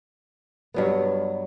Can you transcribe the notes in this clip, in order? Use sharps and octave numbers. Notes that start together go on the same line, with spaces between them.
G2 F#3 B3